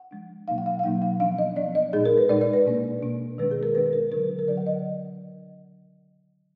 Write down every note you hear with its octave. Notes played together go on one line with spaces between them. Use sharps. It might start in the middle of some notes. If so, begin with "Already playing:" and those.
Already playing: F#5
F3 G#3 D4
B2 F#3 A#3 D#4 F5
F#5
F5
F5
B2 F#3 A#3 D#4 F#5
F5
F3 B3 D4 F5
D#5
F3 B3 D4 D5
D#5
A#2 G#3 D#4 G#4
A#4
B4
A#2 G#3 D#4 D5
D5
B4
B2 A#3 D4
B2 A#3 D4
D#3 G#3 B3 D4 B4
G#4
A#4
D#3 G#3 B3 D4 B4
B4
A#4
D3 F#3 D4 A#4
B4
A#4
D3 F#3 D4 D5
F#5
D#5